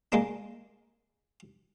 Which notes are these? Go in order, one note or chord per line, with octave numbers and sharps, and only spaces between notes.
G#3 A#3 D4